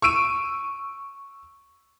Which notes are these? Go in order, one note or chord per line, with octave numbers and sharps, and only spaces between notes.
C#6 E6 D7 D#7